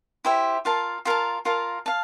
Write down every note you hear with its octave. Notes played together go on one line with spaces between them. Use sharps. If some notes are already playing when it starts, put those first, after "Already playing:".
E4 G4 C5 E5
F4 A#4 F5 A5
F4 A#4 F5 A5
F4 A#4 F5 A5
F5 A5